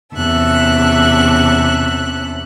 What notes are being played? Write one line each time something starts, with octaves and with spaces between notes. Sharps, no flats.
E2 C3 C#4 E5 A5 F#6